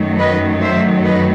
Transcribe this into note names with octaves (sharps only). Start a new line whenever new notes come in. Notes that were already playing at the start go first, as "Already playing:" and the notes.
Already playing: F#2 D#3 F#3 A3
B4 D#5
C5 E5
B4 D#5